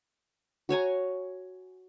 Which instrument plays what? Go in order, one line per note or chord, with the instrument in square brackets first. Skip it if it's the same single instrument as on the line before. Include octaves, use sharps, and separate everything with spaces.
[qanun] F#4 C#5 G#5 A#5